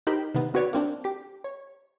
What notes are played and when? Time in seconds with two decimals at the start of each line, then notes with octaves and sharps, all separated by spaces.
0.07 D#4 G4 A#4 C5 G5 B5
0.35 C3 D#3 B3
0.54 C4 F#4 B4 C#5 D5
0.73 A#3 C4 D4
1.04 G4 B6
1.44 C#5